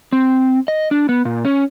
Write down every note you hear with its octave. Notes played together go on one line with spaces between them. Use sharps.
C4
D#5
D4
B3
A#2
C#4